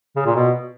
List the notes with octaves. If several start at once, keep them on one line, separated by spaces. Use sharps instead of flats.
C#3
A#2
B2